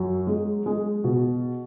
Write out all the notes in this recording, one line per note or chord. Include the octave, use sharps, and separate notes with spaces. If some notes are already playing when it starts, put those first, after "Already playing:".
Already playing: F#2 F#3
G#3
G#3
B2